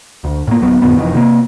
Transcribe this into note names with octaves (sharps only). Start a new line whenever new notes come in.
D2
A2 A#3
D1 F#3 B3
F2 A2 D3 B3
F1 F2 D#3 E3
C3 G3 A#3